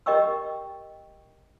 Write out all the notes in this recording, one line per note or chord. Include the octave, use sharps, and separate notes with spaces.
G4 A#4 D#5 G5 C#6 E6